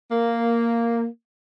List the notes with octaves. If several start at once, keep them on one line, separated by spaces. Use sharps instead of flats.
A#3